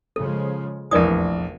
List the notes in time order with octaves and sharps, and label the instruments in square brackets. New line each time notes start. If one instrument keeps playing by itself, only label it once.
[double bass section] C#3 F3 G#3 [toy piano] A4
[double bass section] F1 E2 F3 [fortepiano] A#1 E3 [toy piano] A#4 D5 D#6